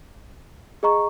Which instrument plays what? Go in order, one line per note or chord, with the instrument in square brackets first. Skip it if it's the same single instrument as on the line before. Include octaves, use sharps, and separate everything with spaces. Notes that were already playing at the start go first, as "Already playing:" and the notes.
[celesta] G#4 D#5 A#5 C#6